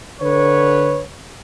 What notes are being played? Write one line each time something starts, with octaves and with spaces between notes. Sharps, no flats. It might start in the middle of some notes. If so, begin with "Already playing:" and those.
D3 B4 C#5